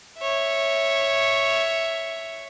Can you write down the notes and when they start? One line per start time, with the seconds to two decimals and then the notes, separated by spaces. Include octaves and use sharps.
0.18 C#5 E5